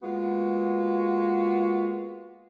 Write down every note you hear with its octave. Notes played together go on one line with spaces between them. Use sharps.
G#3 A#3 B3 F4 F#4